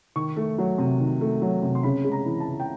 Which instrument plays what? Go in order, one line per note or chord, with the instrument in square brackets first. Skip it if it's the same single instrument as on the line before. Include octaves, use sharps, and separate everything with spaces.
[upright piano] D#3 C#6
A3
F#3
C3
D#3
A3
F#3
C3
C6
C#3 B5
G#3
A#5
E3
A5
C#2
G5